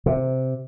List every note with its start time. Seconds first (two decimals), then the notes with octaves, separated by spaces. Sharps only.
0.06 C3